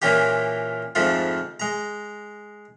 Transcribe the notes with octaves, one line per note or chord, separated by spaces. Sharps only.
A#2 E3 A#3 C#4 F4 G4
F2 G#2 F3 A3 F4
G#3 A#5